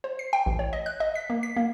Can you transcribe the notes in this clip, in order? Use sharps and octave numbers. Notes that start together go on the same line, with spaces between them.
C5
C7
G5
A1
C#5
D#5
F#6
D#5
B6
A#3
B6
A#3